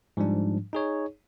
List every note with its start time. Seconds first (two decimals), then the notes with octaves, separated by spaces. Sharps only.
0.17 G#2 F3 G3 D4
0.73 D#4 G#4 C#5